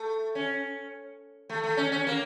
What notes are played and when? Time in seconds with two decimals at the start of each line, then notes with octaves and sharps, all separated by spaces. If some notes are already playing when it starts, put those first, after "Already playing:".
Already playing: A3
0.35 C#4
1.49 A3
1.64 A3
1.77 C#4
1.92 C#4
2.07 A#3